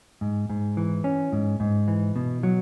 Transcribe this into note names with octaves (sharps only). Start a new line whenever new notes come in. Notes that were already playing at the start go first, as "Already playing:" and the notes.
G#2
G#2
E3
C#4
G#2
G#2
E3
B2
F#3